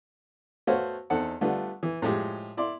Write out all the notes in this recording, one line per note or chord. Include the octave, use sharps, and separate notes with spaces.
A3 B3 F#4 C5 C#5 F5
E2 C4 D#4 A4 F#5
D3 G3 A3 B3 F4
E3
A2 F3 G#3 G4
E4 D5 C6